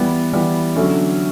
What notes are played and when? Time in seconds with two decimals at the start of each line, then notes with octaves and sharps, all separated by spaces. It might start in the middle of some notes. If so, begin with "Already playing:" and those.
Already playing: E3 G3 B3
0.33 E3 G3 B3
0.76 D3 F#3 A3 C#4